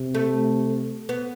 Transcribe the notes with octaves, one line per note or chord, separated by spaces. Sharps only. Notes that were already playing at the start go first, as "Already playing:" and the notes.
Already playing: C3
A3
B3